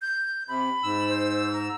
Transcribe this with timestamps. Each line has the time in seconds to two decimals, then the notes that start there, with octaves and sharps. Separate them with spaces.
0.02 G6
0.48 C3 B5
0.83 G#2 E6
1.09 C5
1.53 A#5